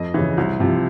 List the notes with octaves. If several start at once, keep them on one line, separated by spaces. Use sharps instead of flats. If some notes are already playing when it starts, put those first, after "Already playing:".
Already playing: F2 D#5
C#3 E3
C2
C3 F3